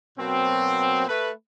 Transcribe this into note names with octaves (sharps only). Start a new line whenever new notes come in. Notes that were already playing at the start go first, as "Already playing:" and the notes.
B2 F#3 A#3 C4
A3 B4